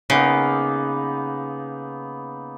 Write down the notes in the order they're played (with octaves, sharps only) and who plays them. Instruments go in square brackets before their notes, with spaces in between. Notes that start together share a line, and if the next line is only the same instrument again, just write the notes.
[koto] C#3 [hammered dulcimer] A#3 B3 D#4